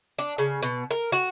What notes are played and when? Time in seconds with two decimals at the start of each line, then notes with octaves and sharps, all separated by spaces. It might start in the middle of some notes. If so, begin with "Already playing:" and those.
0.19 D4
0.38 C#3
0.63 B2
0.91 A#4
1.12 F#4